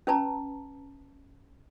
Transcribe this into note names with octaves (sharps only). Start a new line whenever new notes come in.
C#4 B4 A5 A#5